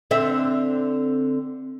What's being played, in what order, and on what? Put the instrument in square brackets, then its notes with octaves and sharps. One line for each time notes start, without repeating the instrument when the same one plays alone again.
[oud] D3 C4 E5